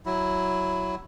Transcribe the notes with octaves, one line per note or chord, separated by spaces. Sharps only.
F#3 E4